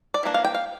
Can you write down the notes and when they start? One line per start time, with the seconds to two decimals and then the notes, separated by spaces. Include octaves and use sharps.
0.14 D5
0.23 E3 A#3 D4
0.34 F5
0.45 G5
0.55 F5